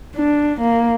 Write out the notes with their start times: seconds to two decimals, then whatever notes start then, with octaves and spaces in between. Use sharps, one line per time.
0.16 D4
0.60 A#3